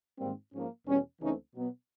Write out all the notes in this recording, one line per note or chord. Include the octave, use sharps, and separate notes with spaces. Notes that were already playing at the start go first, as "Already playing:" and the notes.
G#2 D#3 G3 A#3 C4
G#2 F3 A#3 C#4
E2 B2 G3 C#4
C#2 C#3 E3 A3 C4 C#4 D#4
B2 F#3 B3